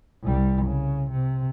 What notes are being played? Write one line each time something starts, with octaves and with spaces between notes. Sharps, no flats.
C2 G3
C#3
C3